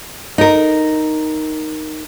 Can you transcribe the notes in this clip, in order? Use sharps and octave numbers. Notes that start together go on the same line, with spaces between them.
D#4 A#4